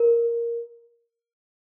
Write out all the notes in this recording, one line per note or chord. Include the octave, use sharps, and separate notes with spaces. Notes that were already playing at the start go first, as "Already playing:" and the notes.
Already playing: A#4